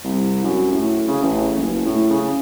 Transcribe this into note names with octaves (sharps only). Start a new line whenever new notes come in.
C2
F#2
A2
C#3
A1
F#1
A2
C#3